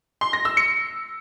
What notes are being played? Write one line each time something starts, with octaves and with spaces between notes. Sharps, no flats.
C6
A#6
E6
C#7